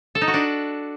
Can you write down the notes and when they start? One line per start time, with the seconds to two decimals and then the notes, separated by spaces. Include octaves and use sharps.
0.15 A4
0.21 D#4
0.28 F#4
0.34 D4